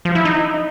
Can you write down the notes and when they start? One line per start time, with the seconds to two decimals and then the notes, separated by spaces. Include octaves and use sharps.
0.05 F3
0.15 E4
0.25 D#4